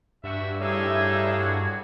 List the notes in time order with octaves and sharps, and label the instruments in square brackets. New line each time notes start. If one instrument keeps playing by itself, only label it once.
[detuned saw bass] G2 [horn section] G3 F#4 E5
[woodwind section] A2 G4 G#4 [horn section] D#4 E5 F5
[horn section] F#4